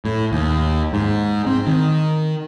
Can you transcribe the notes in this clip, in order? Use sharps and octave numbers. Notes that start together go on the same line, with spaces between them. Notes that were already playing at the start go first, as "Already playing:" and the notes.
A2
D#2
G#2
C4
D#3